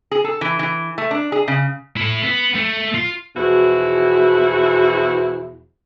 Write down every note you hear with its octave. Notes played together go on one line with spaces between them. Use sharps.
G#4
A4
E3
E3
A3
D4
G#4
C#3
E4 A4
B3
A3
F4
E2 B2 F3 E4 F#4 G#4